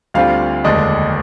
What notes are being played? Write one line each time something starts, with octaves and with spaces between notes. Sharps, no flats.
D2 D3 G3 C4 F4 F5
F1 D#2 D3 G#3 D4 D#5